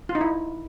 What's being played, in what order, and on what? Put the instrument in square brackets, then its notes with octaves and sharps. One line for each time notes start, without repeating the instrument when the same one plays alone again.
[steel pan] F4
D#4
E4